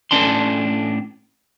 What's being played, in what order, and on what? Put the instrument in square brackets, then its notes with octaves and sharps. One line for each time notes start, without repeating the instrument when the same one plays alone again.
[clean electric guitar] A2 C#4 D4 A5 C6